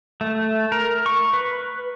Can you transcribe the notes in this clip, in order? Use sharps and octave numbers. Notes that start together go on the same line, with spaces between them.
A3
A#4
C#6
B4